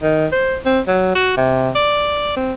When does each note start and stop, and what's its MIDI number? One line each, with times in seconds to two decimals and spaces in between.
0.03 0.27 51
0.32 0.56 72
0.66 0.81 60
0.88 1.13 54
1.15 1.37 66
1.37 1.70 48
1.75 2.32 74
2.36 2.54 60